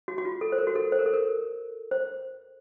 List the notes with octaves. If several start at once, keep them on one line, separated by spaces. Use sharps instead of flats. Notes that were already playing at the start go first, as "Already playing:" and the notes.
F#4
F#4
F4
A4
C5
A#4
F#4
A4
C5
A#4
A4
A#4
C5